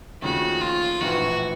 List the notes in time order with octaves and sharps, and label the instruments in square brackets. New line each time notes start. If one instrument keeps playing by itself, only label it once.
[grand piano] D#2 C#3 F3 A3 [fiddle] F#4
[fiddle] F4
[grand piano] A#1 A2 E3 [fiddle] F#4